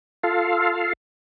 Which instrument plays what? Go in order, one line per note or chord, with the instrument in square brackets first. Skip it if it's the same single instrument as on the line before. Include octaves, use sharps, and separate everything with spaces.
[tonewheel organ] F4 A4 F5